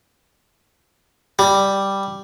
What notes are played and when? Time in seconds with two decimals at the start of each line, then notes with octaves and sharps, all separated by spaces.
1.39 G3